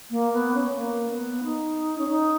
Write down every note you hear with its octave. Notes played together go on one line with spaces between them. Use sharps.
A#3
B3
C#4
A#3
B3
D#4
C#4
D#4